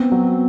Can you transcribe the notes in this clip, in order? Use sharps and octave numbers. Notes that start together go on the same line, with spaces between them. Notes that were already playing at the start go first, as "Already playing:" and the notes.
Already playing: B3 C4
F#3